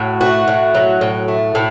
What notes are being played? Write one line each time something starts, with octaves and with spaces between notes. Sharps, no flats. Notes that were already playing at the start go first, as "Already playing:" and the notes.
Already playing: A2 F#3
A3 F#4
A2
F#3
A2
A3
A2